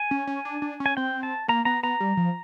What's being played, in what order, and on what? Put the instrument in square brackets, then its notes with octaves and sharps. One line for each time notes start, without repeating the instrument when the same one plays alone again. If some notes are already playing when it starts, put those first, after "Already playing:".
Already playing: [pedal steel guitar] G#5
[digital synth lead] C#4
C#4
D4
D4
C#4
[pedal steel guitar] G#5
[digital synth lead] C4 [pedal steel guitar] G5
[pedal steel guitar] A5
[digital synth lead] A#3 [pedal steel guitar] A#5
[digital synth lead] B3 [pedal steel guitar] A#5
[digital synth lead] B3 [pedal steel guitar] A#5
[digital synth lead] G3
F3